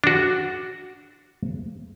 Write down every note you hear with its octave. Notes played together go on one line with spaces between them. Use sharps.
D4 F#4